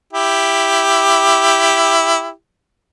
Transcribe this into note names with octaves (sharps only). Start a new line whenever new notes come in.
E4 G4